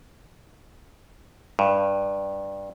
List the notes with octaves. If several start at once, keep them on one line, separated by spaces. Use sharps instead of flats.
G2